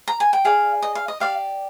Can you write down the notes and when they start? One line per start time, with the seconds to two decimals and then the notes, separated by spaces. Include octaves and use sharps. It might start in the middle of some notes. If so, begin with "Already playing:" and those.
0.08 A#5
0.20 G#5
0.33 G5
0.45 G#4 D5 F5
0.82 D#5
0.95 F5
1.08 D#5
1.20 G4 D5 F5